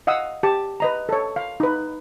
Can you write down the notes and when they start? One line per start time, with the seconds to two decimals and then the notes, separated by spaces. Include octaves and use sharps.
0.07 D#5 F5 F#5 D#6 E6
0.43 G4 A5
0.80 B4 D#5 A#5
1.09 A4 C#5
1.36 F5
1.60 D#4 B4